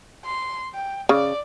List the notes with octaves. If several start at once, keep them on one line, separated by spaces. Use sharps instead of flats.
C6
G5
C#3 D5